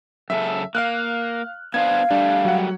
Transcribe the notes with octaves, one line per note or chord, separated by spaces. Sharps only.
F#2 C#3 A4 E5
A#3 F5 F6 F#6
B3 D4 C5 F5 G#6
G3 A3 D4
F#3 F#5